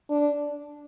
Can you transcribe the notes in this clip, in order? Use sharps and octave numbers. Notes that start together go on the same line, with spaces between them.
D4